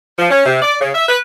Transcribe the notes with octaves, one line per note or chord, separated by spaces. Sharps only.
F3
C#4
C3
D5
C#3
E5
B4